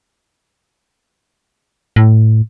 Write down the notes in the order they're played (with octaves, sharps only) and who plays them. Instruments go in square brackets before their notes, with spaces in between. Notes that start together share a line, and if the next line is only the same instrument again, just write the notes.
[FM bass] A2